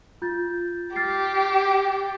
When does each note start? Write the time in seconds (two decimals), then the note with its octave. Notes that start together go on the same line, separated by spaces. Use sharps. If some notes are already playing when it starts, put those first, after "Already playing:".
0.22 F4 G6 A6
0.96 G4 F6 A6 C7